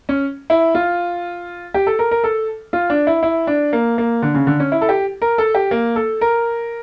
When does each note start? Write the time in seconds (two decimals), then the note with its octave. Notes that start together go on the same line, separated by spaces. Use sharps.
0.09 C#4
0.50 E4
0.75 F4
1.74 G4
1.87 A4
1.99 A#4
2.11 A#4
2.24 A4
2.73 F4
2.90 D4
3.07 E4
3.23 E4
3.47 D4
3.73 A#3
3.98 A#3
4.22 D3
4.34 C#3
4.47 D3
4.60 C#4
4.72 E4
4.81 A4
4.89 G4
5.22 A#4
5.38 A4
5.55 G4
5.71 A#3
5.96 A4
6.21 A#4